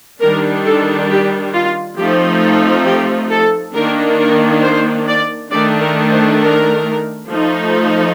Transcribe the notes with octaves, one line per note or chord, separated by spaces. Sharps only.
D#3 G3 D4 A#4
A4
G4
F4
F3 A3 C4 D#4 G4
A4
G4
A4
D#3 A#3 D4 A#4
A#4
C5
D5
D#3 A3 D4 D5
A#4
C5
A#4
F3 A3 D#4